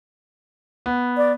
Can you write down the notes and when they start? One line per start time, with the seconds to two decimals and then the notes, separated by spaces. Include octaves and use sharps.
0.86 B3
1.17 D5